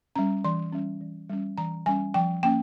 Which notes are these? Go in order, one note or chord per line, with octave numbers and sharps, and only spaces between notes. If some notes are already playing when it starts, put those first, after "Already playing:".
G3 C#4 A#5
E3 C6
G3 C#4
E3
G3 C#4
E3 A#5
G3 C#4 G#5
F3 G5
A#3 C#4 G5